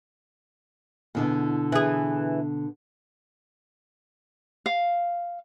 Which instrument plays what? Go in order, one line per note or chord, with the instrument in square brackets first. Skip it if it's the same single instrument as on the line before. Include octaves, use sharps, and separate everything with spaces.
[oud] E2 [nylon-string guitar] B2 D3 B3
[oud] E3 G#4
[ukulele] F5